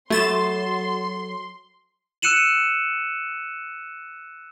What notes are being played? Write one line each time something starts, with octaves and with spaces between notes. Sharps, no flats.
F#3 A3 F#4 A4 C6 A6 E7
E6 F#6 C#7 D#7 E7 F#7